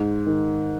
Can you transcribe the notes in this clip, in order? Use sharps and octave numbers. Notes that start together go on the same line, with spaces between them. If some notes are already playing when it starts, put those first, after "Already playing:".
Already playing: G#2
D#3